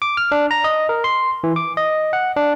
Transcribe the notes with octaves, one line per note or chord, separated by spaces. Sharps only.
D6
F6
D4
A#5
D#5
A#4
C6
E3
D6
D#5
F#5
D4